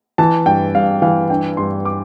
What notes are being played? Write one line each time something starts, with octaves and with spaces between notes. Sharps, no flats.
E3 A5
G2 G5
G2 F5
E3 F5
D4 G5
G2 C6
D6